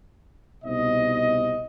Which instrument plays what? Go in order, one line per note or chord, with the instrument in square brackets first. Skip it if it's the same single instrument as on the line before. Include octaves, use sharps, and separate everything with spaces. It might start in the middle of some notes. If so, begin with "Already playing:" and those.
[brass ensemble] C2 B2 D#4 C5 D#5